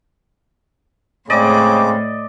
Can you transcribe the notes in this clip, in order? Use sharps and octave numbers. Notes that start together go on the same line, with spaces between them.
A2 C#3 G#3 C4 D5 D#5 D6